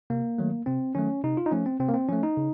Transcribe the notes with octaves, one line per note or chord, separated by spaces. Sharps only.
C3 A#3
D#3 F#3 A3
C3 C4
D#3 F#3 A3 C#4
C3 D#4
F4
D#4
F3 A3 C#4
C4
C3 C4
A#3
C4
F3 A3 C#4
D#4
C#3